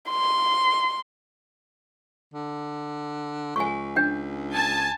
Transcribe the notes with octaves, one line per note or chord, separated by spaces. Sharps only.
C6
D3
C#2 G#5 C#6
D4 G5
G#5 A5